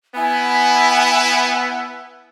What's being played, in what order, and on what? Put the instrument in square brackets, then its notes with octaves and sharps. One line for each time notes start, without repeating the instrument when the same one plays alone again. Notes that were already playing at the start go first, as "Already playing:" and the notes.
[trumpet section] B3 E4 [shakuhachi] G#5